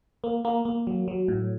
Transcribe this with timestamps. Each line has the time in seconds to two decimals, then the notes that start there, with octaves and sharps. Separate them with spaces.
0.24 A#3
0.45 A#3
0.65 A#3
0.87 F#3
1.08 F#3
1.28 A2